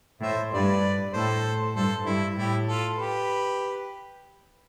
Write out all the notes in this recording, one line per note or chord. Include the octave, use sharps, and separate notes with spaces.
A2 C5 E5
G2 B4 D5
A2 A4 C5
G2 A4 C5
G2 E4
A2 E4 G4
F4 A4
G4 B4